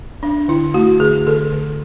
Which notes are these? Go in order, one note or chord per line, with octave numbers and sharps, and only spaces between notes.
D4
D3 E4
A3 F#4
D3 G#4
D3 A4
D3